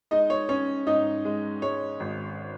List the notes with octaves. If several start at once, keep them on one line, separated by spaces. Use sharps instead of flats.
G#3 D#4 D#5
C#5
C#4 C#5
G#2 D#4 D#5
G#3
G#3 C#5
G#1